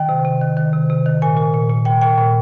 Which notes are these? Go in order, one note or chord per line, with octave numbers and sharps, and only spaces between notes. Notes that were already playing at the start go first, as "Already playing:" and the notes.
Already playing: D#3 G5
C3
C3
D#3
D#3
C3
C3
D#3
A#2 G#5
A#2
A#2
A#2
A#2 G5
A#2 G5
A#2